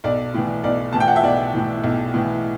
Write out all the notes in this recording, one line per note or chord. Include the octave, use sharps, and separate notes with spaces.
B1 D5
A2 E3
B1 D5
A2 E3 A5
G5
F#5
E5
B1 D5
A2 E3
B1
A2 E3